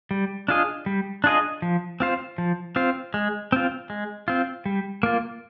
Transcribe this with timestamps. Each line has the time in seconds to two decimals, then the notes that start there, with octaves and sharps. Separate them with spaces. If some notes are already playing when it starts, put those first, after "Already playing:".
0.11 G3
0.48 D4 F4 G#4 D#5
0.86 G3
1.24 D4 F4 G#4 D#5
1.62 F3
2.00 C4 F4 C5
2.38 F3
2.76 C4 F4 C5
3.14 G#3
3.52 C4 F4
3.90 G#3
4.28 C4 F4
4.66 G3
5.03 A#3 F4